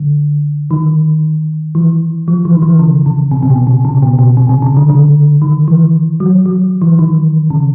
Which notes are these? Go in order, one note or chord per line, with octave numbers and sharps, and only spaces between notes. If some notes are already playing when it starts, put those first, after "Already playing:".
Already playing: D3
D#3
E3
F3
E3
D#3
E3
C#3
C#3
C3
C3
B2
C3
C#3
B2
B2
C3
C3
C#3
D3
D3
D#3
E3
F#3
F#3
E3
D#3
C#3